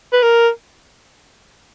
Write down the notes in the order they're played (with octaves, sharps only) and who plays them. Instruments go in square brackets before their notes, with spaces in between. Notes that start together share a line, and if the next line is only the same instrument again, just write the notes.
[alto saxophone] B4
A#4